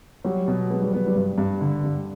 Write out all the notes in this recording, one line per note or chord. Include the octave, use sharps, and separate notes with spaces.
F#3 G3
B2
G#3 B3
G3
F#3 B3
G3
G2
G2
D3
G2